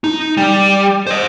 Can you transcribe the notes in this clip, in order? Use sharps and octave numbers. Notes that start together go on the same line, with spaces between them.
D#4
G3
C5 D#5